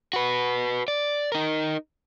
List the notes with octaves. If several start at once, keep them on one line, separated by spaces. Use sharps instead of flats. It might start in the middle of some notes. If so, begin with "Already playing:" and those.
F#4 B4
D5
D#4 A#4